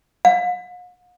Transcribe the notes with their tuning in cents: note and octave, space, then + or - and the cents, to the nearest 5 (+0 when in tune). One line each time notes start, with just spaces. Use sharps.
F5 +45